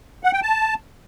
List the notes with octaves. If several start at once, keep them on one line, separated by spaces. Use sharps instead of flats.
F#5
G5
A5